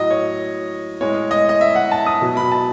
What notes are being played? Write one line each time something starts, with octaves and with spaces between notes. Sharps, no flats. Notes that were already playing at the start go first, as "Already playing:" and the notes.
Already playing: A2 F#3 D#5
C#5
A2 G#3 C#5
D#5
D#5
E5
F#5
A5
D#6
B2 F#3
B5
A5